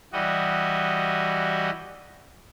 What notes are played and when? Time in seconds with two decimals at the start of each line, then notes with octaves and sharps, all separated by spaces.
0.13 E3 G3 F#4 D#5